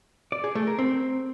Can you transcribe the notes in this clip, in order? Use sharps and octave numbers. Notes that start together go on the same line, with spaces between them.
D5
G#4
A3
A#4
C4